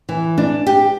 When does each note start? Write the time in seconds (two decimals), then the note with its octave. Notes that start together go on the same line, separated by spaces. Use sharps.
0.09 E3
0.38 D4
0.66 G4